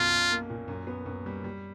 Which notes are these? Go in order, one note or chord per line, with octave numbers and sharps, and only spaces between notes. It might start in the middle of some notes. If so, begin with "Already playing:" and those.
Already playing: B1 F#2 F4
B1
A#3
A#2
F#2
B3
F#2
G3
G3